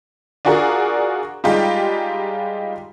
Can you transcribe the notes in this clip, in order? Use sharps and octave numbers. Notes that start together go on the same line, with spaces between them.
D4 F4 F#4 G#4 A#4 D5
G3 G#3 D#4 F4 G4